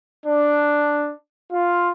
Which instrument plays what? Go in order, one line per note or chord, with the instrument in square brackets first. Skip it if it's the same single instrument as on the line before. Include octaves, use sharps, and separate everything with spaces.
[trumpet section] D4
F4